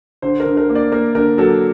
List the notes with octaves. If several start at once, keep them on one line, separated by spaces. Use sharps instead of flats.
D3 C5
A#4
D3
A#4
A#3
D5
A#3 A#4
D3 A#4
F#3 A4